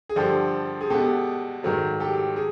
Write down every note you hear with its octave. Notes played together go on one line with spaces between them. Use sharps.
G#4
G2 D3 F3 G4 A4
G#4
B2 G#3 B3 G4 A4
G#2 D#3 F#3 A3
G4 A4
G#4